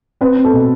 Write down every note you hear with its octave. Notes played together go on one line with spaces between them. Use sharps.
C4 B4
C4
A4
B2